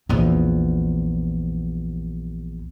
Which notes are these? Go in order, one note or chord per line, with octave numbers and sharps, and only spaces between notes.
A#1 E2